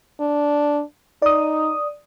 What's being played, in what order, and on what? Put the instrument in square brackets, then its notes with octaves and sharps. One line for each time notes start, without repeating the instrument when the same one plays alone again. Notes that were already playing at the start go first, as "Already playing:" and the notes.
[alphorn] D4
[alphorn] D#4 [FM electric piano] D5 D#6